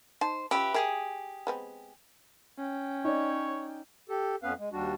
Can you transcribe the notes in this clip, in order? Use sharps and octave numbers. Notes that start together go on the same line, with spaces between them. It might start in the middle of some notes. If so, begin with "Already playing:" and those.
D#4 C5 A5
C#4 F4 G4 B4 E5
G4 G#4 A#4 E5 D#6
G#3 B3 C4
C#4 G5
D#4 C#5 D5
G4 A4
F2 B3 C#4 B4 F5
G#3
D#2 G3 D4 F#4